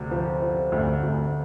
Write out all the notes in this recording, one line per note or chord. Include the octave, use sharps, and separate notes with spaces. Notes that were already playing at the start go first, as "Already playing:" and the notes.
Already playing: D2 C3
F3
F3
D2
D2